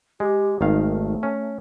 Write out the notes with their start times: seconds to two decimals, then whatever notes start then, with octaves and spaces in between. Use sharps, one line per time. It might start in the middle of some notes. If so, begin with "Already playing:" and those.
0.20 G#3 G4
0.61 G#1 D#3 A3 F5
1.23 C#4